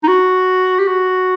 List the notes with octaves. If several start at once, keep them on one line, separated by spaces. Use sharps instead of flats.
D#4
F#4
G4
F#4